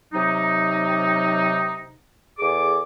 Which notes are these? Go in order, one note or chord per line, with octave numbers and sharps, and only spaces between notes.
C3 F#3 D#4
E2 G#4 A4 D6